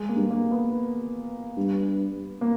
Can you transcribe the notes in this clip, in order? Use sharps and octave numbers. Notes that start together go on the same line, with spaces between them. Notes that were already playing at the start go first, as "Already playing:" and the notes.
Already playing: G#3
A#3
G2
A#3
B3
G2
A#3